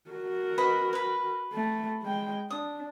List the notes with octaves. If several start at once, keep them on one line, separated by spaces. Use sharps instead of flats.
F#4 A#4
B4 D#5 F#5
B4 B5
A3
G#3 G5
D4 D#6